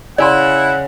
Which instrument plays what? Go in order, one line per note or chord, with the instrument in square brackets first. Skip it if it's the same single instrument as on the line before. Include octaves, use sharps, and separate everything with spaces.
[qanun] C#3 [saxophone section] E4 [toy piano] D5 G#5 C6 [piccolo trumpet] F#5